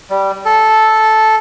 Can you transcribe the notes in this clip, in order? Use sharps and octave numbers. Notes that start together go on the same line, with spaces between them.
G3
A4